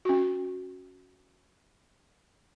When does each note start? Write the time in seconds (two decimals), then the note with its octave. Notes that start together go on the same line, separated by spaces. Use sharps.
0.05 C#4 F#4